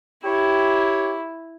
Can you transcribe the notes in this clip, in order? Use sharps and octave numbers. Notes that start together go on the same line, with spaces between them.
E4 G4 C#5